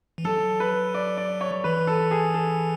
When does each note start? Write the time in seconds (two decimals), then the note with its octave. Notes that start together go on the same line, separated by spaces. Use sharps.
0.18 E3
0.24 F#3 A4
0.60 B4
0.94 D5
1.17 D5
1.41 C#5
1.64 E3 B4
1.87 A4
2.11 G#4
2.34 A4